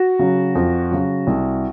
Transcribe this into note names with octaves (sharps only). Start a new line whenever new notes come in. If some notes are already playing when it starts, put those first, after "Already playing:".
Already playing: F#4
C#3 F#3
F2
C#3 F#3
C2